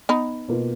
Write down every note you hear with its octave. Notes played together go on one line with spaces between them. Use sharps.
B3 D#4
B2 A#3 F4 B4